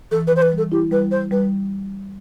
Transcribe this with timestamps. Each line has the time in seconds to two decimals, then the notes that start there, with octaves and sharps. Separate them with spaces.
0.11 E3 A4
0.27 B4
0.32 E3 C5
0.41 B4
0.52 G3
0.57 A4
0.71 E4 G4
0.91 G3 B4
1.11 G3 C5
1.31 G3 B4